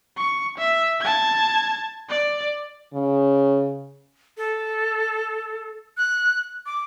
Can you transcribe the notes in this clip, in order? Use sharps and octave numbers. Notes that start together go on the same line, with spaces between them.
C#6
E5
A5 G#6
D5
C#3
A4
F#6
D6